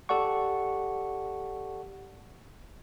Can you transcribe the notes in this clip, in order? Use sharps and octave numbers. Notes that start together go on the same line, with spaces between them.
G4 A4 D5 F#5 C#6